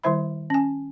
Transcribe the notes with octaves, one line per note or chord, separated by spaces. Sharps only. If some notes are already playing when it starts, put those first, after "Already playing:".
D#3 G3 E4 C5 E5 B5
C#4 G#5